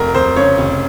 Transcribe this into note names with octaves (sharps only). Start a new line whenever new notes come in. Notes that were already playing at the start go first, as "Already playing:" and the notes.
Already playing: F1 A#4
F1 C5
C#3 C#5
F1